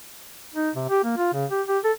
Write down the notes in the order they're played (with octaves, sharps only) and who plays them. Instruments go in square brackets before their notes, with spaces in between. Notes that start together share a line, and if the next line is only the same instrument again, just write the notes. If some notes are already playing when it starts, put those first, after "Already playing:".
[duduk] D#4
C3
G4
A#3
F4
C#3
G4
G4
A4